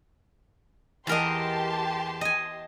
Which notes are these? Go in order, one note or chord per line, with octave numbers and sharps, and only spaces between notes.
E2 G4 A#4 D#5 A5 C6
D#5 G#5